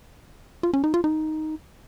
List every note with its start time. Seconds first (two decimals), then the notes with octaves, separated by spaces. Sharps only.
0.63 F4
0.74 C#4
0.84 D#4
0.94 F4
1.04 D#4